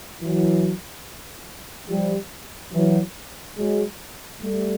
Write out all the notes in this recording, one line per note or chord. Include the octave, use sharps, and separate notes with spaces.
E3 F#3
F3 G3
E3 F#3
F#3 G#3
G3 A3